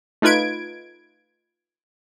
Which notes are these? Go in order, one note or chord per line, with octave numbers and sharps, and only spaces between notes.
A3 D#4 F4 B4 G#6 D7